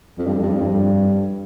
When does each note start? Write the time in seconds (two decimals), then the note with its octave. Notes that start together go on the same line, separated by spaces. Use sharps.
0.18 F2
0.26 G2
0.33 F2
0.42 G2
0.50 F2
0.62 G2